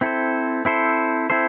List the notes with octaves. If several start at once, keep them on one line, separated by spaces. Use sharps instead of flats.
C4 E4 A4 C5
C4 E4 A4 C5
C4 E4 A4 C5